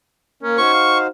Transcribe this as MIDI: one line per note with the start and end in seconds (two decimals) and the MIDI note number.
0.43 0.57 58
0.43 0.69 61
0.43 0.57 70
0.58 1.07 63
0.58 1.07 66
0.58 1.07 72
0.58 0.98 85
0.73 1.05 77